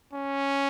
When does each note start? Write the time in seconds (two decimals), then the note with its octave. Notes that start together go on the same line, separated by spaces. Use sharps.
0.13 C#4